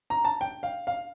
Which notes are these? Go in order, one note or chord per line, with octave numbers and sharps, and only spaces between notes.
A#5
A5
G5
F5
F5